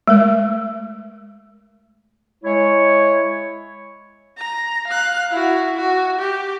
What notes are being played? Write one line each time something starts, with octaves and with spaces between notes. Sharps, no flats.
G#3 A3 A#4
G#3 E4 C#5
A#5
F5 F#6
E4 F#4
F#4
G4